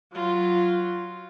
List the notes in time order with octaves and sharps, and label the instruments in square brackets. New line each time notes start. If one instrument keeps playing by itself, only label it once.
[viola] F#3 F4